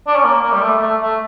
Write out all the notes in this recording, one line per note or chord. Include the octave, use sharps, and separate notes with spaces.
D4
C#4
A#3
A#3
G3
A3
A3
A3